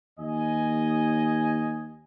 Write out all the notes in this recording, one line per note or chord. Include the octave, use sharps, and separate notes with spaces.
D#2 D#5 G#5